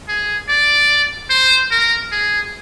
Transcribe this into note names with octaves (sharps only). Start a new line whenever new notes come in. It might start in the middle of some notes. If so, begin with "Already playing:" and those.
G#4
D5
C5
A#4
G#4